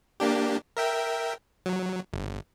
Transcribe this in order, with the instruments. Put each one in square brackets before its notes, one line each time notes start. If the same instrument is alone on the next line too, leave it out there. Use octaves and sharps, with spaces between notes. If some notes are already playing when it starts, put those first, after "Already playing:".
[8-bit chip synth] A#3 D4 G4
A#4 E5 G5
F#3
G1